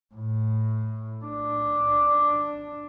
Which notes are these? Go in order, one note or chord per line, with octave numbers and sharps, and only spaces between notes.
A2
D4